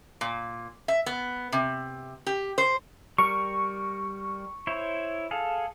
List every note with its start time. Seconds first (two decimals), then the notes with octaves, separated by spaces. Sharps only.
0.21 A#2
0.88 E5
1.06 B3
1.52 C3
2.26 G4
2.58 C5
3.18 G3 A#4 C#6
4.67 E4 C5 C#5
5.31 G#4 A4 F5